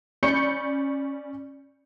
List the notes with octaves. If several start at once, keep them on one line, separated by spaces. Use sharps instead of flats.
C#4 D5 B5 C#6 G6 C#7